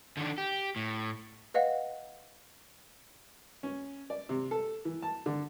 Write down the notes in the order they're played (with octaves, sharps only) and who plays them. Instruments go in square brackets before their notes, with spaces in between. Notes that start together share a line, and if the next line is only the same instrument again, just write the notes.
[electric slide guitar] D3 D#3 D4
G4
A2
[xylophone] B4 D#5 F5 F#5
[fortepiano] C#4
D5
C3
A4
E3
A5
D3